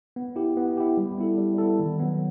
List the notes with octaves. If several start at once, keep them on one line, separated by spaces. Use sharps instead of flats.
B3
E4 G4
B3
E4 G4
G3
B3 E4 A4
G3
B3 E4 A4
D#3
F#3 B3